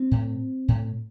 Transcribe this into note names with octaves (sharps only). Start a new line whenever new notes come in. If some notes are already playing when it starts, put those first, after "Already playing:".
Already playing: C4
A2
A2